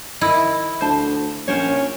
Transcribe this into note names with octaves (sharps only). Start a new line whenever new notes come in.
D#3 E4 D#5
D2 C5 A5
A#1 C#4 A#4 C5 C#5